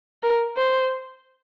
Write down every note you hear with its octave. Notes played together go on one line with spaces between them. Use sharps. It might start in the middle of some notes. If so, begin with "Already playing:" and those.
A#4
C5